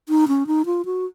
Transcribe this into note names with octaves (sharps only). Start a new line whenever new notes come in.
D#4
C#4
D#4
F4
F#4